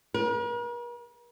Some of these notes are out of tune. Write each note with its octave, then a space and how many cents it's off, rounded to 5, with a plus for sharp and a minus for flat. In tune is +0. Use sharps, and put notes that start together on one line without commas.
A#4 +45